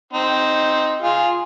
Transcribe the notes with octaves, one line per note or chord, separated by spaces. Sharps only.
C4 D#4
F4 G#4